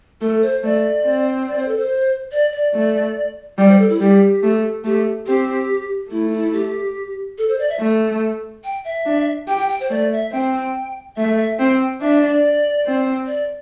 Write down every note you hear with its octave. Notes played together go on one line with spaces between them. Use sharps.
A3 A4
C5
A3 D5
C4
D5
C5
A4
C5
D5
D5
A3
G3 D5
C5
A4
E4
G3 G4
A3
A3 G4
C4 G4
A3 E4
E4
G4
A4
C5
D5
E5
A3
G5
E5
D4
G4 G5
G5
G5
C5
A3 D5
E5
C4 G5
A3 E5
E5
C4 G5
D4 E5
D5
C4
D5